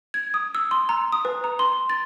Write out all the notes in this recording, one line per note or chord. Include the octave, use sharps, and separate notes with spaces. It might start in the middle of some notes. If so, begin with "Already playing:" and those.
G#6
D#6
E6
C6
A#5
D#6
B4
A#5
C6
A6